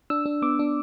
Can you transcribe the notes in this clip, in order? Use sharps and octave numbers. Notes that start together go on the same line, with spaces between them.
D4 E6
D4
B3 D6
D4